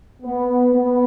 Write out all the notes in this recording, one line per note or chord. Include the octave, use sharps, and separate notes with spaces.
B3
B3